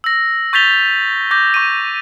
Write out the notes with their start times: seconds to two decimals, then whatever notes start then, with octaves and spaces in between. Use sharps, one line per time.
0.04 E6 A#6
0.53 C#6 G6 A6 B6 F7 G7
1.31 D6 G6 A#6
1.54 C#6 D#7